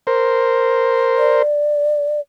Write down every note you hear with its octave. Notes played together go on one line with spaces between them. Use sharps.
A#4 C5
D5